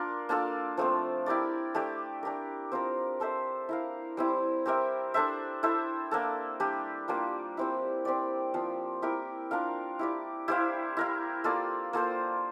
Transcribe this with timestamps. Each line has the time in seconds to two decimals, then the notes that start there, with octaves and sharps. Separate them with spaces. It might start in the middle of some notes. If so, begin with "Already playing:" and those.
Already playing: A#3 D4 F4 A#4 D5
0.29 A#3 D4 F4 A4
0.77 F3 A3 C4
1.26 E4 G4 A#4 D5
1.75 A3 D4 G4 D5
2.23 D4 G4 A#4
2.72 C4 F4 A#4
3.20 D4 A4 C5 E5
3.69 E4 A#4 F5
4.17 G3 C4 E4
4.66 C4 G4 A#4 E5
5.14 D4 A4 C5 E5
5.63 E4 A4 C5 E5
6.11 A#3 D4 A4
6.60 G3 D4 G4
7.08 G3 A#3 D4 F4
7.57 G3 C4 E4
8.05 C4 G4 D5
8.54 F3 C4 F4
9.02 E4 G4 A#4
9.51 D4 F4 A#4 F5
9.99 E4 G4 D5
10.48 E4 G4 C5 F5
10.97 E4 A#4 F5
11.44 A#3 F4 A4 D5
11.93 A#3 F4 A4 C5